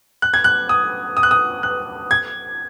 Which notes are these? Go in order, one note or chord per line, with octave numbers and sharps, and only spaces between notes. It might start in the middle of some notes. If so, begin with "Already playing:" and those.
F#6
G#6
F#6
D#6
D#6
F#6
D#6
F#6
G#6